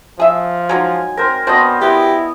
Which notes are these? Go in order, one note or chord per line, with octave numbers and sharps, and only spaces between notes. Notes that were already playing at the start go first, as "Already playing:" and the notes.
F3 G#4 E5
F#3 G#3 D#4 G#5
C4 A#4 C5
B3 C4 D4 F#4 C5 D#5
B3 E4 G4